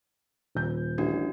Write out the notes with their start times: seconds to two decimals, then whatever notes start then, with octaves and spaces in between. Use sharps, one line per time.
0.55 D#1 G6
0.98 A1 D4 F#4